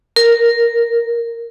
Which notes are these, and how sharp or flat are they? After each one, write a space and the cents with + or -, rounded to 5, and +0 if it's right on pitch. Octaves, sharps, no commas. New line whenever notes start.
A#4 -5